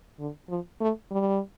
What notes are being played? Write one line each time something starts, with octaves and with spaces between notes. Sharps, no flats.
D3
F3
A3
G3